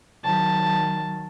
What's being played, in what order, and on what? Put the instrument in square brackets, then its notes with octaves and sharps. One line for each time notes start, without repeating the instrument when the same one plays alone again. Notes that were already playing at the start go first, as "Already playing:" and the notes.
[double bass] D#3 F#3 [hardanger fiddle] A5